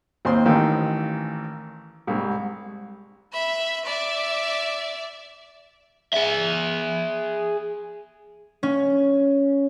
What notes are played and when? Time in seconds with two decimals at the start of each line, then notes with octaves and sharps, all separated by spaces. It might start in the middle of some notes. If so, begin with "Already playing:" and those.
0.25 D#2 C4 C6
0.45 A1 D#3 E3 F5
2.07 C2 G#2
3.33 E5 B5
3.85 D5 E5
6.13 G#4 E5
8.63 C#4